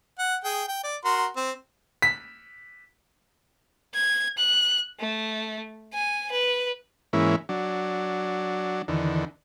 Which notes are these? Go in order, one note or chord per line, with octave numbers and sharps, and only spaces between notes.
F#5
G#4 G5
G5
D5
F#4 A#4 C6
C4
B6
G#6
F#6
A3
G#5
B4
G#2 E3 A#3 C#4 E4
F#3 D4
E2 D3 D#3